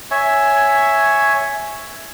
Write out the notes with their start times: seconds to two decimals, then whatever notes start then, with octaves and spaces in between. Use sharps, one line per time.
0.11 C#5 E5 G#5